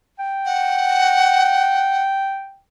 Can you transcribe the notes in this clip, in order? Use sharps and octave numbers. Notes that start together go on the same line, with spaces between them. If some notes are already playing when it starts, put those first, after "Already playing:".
G5
F#5